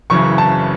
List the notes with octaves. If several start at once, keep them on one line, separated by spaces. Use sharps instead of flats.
F#1 F#2 C#3 E3 C#6
A5